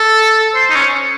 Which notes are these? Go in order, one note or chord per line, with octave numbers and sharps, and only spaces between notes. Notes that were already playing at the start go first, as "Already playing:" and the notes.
Already playing: A4
C5
D#4
C#4